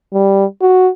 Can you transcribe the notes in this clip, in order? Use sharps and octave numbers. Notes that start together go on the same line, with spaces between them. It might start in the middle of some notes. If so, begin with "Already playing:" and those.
G3
F#4